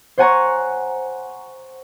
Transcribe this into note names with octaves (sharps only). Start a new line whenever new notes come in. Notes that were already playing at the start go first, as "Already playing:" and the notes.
C5 C#5 F#5 G#5 A#5 C#6